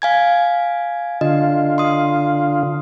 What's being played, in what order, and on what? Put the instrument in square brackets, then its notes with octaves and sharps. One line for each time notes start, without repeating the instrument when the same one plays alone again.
[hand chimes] F5 G#5 G#6
[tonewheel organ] D3 F4 [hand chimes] D#5
[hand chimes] C6 D#6